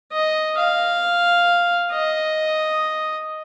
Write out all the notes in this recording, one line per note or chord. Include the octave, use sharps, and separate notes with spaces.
D#5
F5
D#5